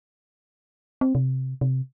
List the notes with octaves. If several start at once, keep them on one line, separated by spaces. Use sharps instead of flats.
C4
C3
C3